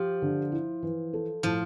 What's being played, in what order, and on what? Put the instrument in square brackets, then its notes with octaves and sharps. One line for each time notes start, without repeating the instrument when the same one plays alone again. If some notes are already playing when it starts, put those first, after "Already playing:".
Already playing: [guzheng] F3 [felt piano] G4
[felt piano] D3
E4
E3
A4
[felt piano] A2 [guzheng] F3